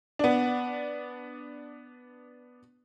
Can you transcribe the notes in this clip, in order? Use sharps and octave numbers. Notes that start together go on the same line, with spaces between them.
B3 D4